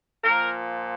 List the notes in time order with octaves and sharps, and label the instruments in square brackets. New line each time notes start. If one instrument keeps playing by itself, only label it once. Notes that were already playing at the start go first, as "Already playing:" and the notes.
[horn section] A#2 F3 A#4